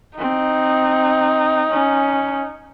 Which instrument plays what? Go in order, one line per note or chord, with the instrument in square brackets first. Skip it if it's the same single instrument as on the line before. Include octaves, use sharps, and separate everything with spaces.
[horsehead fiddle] C4 [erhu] D#4
[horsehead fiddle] C#4